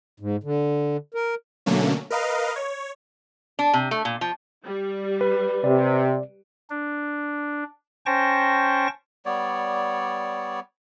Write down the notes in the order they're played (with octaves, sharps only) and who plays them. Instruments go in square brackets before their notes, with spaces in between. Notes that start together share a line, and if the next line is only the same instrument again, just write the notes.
[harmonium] G#2
D3
A#4
[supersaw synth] B2 D3 F#3 A3 A#3 C#4
A#4 B4 D#5 F5
C#5
[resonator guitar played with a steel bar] D4
C3
A3
A#2
F3
[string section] G3
[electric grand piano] B4
[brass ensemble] C3 [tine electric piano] D5
[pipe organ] D4
C#4 C5 G5 A5 C#6 A#6
[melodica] G3 B3 C#5 D5